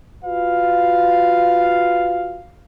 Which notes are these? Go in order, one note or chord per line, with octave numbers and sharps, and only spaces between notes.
F4 F#4 B4 F5